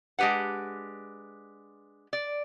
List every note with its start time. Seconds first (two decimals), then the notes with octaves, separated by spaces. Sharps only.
0.19 G#3 D4 G4 B4 F#5
2.13 D5